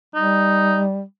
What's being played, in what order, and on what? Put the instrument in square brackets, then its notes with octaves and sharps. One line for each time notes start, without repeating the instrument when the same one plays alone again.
[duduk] G3 [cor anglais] D#4